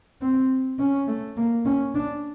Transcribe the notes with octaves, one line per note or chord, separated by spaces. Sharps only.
C4
C#4
A3
A#3
C#4
D4